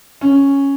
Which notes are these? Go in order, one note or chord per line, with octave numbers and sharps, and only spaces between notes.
C#4